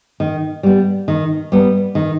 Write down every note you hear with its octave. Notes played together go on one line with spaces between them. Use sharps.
D#3
G3 B3
D#3
G3 B3
D#3